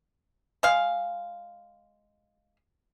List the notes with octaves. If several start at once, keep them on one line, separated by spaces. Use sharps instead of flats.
G#3 F5